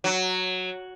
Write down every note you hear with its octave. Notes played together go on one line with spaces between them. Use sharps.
F#3